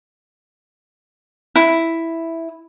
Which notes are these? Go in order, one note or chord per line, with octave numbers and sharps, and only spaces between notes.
E4